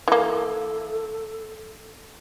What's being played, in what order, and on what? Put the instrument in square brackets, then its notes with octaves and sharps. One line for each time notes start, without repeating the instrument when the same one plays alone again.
[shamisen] E3 A#3 [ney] A4